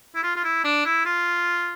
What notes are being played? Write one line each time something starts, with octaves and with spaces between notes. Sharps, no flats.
E4
F4
F4
E4
D4
E4
F4